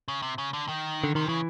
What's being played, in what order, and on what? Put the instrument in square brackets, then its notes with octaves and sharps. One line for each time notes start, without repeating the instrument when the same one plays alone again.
[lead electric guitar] C#3
C3
C#3
D3
D#3
[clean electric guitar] D3
[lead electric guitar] C3 [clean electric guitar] D#3
[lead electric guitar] C#3 [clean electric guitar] E3